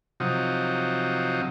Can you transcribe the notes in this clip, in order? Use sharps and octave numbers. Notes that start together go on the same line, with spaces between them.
C3 F3 F#3 D#4